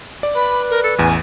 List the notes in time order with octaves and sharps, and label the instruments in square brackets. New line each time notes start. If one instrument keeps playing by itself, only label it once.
[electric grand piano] D5
[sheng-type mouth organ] B4 [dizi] B5
[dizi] A#4
A4
[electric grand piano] A1 E2 [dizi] G#5